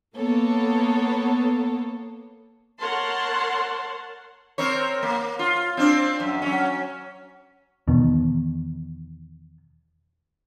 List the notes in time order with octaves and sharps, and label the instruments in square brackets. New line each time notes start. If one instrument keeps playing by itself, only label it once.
[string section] A#3 B3 A4 C#5
[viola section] A#4 C#5 F#5 A5 C6
[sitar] C4 A#4 C#5
A#3
F4
C4 D4
F#2
F#3 C#4
[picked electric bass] E2 B2 D#3